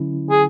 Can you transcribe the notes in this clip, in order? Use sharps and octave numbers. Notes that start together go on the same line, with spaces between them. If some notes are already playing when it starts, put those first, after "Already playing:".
Already playing: D3 F#3 C#4 E4
G#4